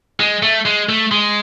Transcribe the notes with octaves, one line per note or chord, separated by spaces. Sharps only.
G#3
A3
G#3
A3
G#3